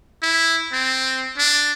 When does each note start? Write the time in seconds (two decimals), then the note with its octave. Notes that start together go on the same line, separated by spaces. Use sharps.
0.23 E4
0.73 C4
1.38 D4